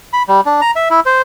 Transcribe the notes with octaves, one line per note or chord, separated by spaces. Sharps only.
B5
G3
D4
A#5
E5
E4
C5